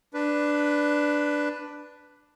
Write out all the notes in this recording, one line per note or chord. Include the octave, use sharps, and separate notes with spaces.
D4 B4